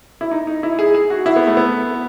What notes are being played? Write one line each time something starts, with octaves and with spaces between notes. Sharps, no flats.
E4
D#4
D#4
E4
G#4
G#4
F#4
E4
B3
A3
B3